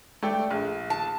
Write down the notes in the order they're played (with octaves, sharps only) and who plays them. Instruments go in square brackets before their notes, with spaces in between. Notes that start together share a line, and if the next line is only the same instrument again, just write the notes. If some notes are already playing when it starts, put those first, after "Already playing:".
[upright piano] A3 D5 G5
A#1
[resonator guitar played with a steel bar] A5